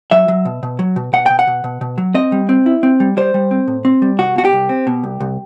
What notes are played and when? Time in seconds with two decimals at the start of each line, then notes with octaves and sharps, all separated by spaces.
0.11 F#3 E5
0.28 F#3
0.45 B2
0.63 B2
0.79 F#3
0.96 B2
1.13 B2 F#5
1.26 B2 G5
1.39 F#5
1.47 B2
1.64 B2
1.81 B2
1.98 F#3
2.15 C4 D#5
2.32 G3
2.49 C4
2.66 E4
2.83 C4
3.00 G3
3.17 G3 C5
3.34 G3
3.51 C4
3.68 A2
3.85 C4
4.02 G3
4.18 C2 F#4
4.36 B2 F#4
4.45 G4
4.53 C2
4.69 C4
4.87 B2
5.04 C2
5.21 C2